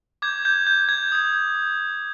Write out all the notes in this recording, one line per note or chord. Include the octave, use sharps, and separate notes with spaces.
D6 G6 G#6
G6
G6
G#6
D#6 G6